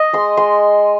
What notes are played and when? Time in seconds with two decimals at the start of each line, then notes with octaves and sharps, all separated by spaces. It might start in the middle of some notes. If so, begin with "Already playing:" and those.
Already playing: D#5
0.13 G#3 C6
0.37 G#3 C6